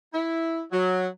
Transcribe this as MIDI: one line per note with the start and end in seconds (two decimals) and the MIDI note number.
0.13 0.62 64
0.72 1.06 54